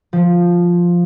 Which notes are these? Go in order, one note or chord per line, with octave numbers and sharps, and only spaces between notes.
F3